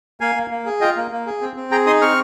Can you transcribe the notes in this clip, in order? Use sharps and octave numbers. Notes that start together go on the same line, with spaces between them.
A#3 F5 G#5
A#3
A#3
G#4
F4 D#5 G5
A#3
A#3
G#4
C4
C4
G#4 G5 A#5
D#4 C6 D#6
C4 C#6 F6